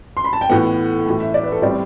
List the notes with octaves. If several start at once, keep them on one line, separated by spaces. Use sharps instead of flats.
C6
B5
A5
G5
A2 E3 B3 F#5
A2 E3 A3
E5
D5
B4
A4
A2 G3 C4 D5